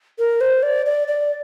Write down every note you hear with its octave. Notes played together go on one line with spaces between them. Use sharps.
A#4
C5
D5
D5
D5